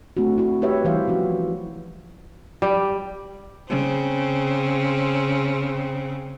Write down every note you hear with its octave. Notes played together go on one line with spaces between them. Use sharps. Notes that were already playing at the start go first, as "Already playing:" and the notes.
A3 C4 D4 F#4
E4 F#4
E4 G4 B4 C#5 E5
E3 G3 C5 F5
F3 C#4 F#4
G3
C#3 C4